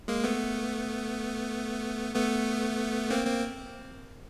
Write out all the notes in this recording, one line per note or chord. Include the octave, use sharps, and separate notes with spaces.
G#3 A#3
A3 B3
A3 B3
A#3 C4
A#3 C4